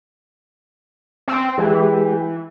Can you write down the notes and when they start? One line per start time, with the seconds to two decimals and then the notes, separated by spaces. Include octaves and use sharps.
1.28 C4
1.58 E3 G#3 G4